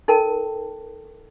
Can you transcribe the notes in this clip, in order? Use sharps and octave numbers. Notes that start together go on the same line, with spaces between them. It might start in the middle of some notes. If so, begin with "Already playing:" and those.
D#4 A4 A#4 G5 A5